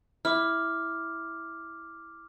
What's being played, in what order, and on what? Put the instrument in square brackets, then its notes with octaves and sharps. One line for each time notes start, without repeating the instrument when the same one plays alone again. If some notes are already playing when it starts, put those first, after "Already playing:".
[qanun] E4 [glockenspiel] D6 F6